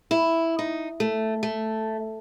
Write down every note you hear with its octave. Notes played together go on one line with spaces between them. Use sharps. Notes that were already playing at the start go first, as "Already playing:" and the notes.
E4
D#4
A3
A3